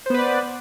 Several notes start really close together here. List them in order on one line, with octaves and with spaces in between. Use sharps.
C5 B3 B4 D5